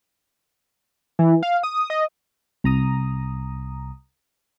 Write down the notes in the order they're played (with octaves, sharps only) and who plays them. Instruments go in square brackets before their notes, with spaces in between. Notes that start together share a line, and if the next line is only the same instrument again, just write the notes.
[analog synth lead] E3
F5
D#6
D#5
[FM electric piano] C2 A#5 D#6